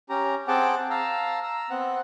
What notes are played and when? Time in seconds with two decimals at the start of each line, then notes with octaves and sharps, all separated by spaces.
0.10 C#4 G4 A#5
0.48 C4 G#4 F#5 G5 A5 D6
0.90 F5 A5 A#5 E6
1.43 A#5 E6
1.70 B3 C4 F#5